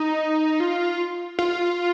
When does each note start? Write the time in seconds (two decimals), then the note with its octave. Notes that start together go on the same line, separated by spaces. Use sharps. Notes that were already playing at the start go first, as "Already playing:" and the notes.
Already playing: D#4
0.60 F4
1.39 F4